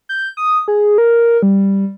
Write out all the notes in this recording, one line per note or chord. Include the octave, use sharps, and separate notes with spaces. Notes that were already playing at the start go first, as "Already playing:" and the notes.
G6
D#6
G#4
A#4
G3